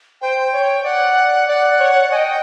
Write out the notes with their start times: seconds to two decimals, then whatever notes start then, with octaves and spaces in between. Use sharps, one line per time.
0.21 C5 G5
0.53 C#5
0.84 D5 F#5
1.48 D5 F#5
1.80 C#5
2.11 D#5 G#5
2.16 G5